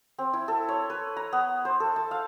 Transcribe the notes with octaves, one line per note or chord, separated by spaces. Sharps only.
C4
E4
A4
C#5
B4
A#5
B3
C5
A4
A5
F5